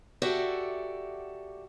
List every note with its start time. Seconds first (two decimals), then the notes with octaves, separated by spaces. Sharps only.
0.22 F#4 G4 A4 D5 E5 F#5